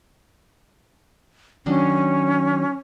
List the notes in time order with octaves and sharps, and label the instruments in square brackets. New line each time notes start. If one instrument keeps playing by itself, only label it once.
[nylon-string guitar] D#3 F#3 D4 [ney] C#4